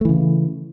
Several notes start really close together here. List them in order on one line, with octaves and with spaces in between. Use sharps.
A3 E3 C#3